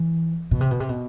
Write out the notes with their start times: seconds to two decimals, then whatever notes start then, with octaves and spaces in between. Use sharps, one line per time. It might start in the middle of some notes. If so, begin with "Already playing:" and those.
Already playing: E3
0.51 B2
0.61 C3
0.71 B2
0.80 C3
0.89 B2